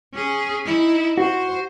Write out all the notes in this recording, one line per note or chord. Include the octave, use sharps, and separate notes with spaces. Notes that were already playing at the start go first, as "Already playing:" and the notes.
C#4 G#4
D#4 E4
F#4 C5